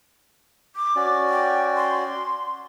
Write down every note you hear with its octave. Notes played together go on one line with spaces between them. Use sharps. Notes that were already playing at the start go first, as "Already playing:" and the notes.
D6
C#4 F#4 D5
G5
C6